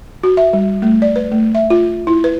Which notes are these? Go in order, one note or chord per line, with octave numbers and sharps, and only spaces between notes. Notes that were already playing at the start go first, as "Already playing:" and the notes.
F#4
E5
G3
A3
D5
B4
A3
E5
F4
E4
B4